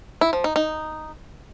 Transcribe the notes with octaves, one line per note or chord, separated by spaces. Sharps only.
E4
F3
D#4
D#4